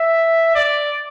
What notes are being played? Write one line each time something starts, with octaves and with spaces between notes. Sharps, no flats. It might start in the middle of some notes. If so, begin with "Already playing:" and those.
Already playing: E5
D5